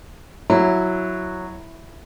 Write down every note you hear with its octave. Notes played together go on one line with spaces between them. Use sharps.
F#3 E4